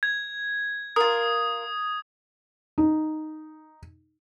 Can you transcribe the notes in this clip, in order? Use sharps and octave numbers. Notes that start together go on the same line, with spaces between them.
G#6
F4 A#4 D#6
D#4